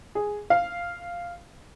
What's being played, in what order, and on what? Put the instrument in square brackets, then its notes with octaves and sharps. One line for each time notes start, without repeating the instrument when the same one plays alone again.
[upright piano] G#4
F5